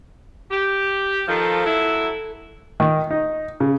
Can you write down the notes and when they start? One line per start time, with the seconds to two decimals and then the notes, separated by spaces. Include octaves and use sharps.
0.51 G4
1.28 D#3 F3 A4
1.66 F#3 E4
2.80 D#3
3.11 D#4
3.60 C#3